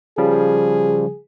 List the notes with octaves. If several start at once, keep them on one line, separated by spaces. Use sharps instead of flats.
C#3 F3 G3 G#4